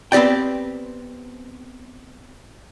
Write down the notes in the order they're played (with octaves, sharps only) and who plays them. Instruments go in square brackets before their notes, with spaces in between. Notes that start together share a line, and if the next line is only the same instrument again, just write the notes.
[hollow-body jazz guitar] B3 C4 G4 D5 G5